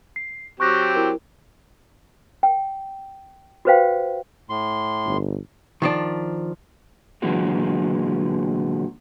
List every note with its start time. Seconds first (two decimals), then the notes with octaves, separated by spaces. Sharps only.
0.16 C7
0.60 F#3 C4 G4 C#6 F#6 A#6
0.95 E4 A#4
2.43 G5
3.65 F#4 G4 B4 C5 F5 G5
4.49 A2 C6
5.05 G1
5.82 D#3 F3 D4
7.22 A#2 D3 E3 F#3 G#3 B3